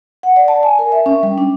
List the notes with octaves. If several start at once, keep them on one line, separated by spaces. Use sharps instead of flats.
F#5
D5
A5
G#5
A#4
E5
C#4
G3
D4